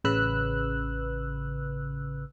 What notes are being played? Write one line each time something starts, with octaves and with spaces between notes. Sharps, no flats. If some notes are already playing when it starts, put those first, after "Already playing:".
A1 C#3 B4 E6 F#6